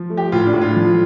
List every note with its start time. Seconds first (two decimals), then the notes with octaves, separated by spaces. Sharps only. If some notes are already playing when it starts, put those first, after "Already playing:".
Already playing: F3
0.10 A3
0.17 G4
0.32 A2 F4
0.47 D4
0.54 A2
0.61 F4
0.76 F3